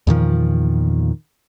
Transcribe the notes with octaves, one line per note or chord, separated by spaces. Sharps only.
E2 A#2 D#3 F3